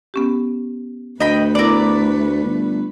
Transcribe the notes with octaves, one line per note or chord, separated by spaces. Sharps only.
B3 C#4 G4
D2 A3 B4 D#5 G5 B5
B3 E4 A#4 D5
G1